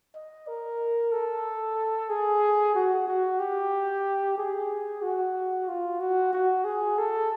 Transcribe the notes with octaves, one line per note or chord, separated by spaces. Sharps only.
D#5
A#4
A4
G#4
F#4
F#4
G4
G#4
F#4
F4
F#4
F#4
G#4
A4